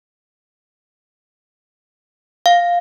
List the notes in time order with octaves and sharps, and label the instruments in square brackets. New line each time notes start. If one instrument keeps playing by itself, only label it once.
[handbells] F5